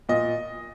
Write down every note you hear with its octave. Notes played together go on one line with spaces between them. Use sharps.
A#2 D#5